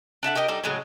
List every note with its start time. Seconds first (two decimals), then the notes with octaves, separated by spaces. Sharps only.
0.23 D4 A4 E5 F#5
0.35 G4 A#4 D#5 G5
0.48 G3 D#4 G4 A4
0.64 A2 C#3 F#3 G#3